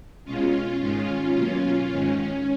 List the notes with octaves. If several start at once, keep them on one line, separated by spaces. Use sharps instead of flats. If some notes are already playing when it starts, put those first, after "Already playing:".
B2 G#3 C#4 F4
G#2 D#3 G#3 C#4 F4
B2 F#3 A#3
G#2 D#3 G#3 C#4